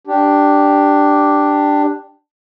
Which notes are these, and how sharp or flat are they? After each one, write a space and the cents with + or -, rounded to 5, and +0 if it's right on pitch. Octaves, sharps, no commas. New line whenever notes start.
D4 +0 G4 +0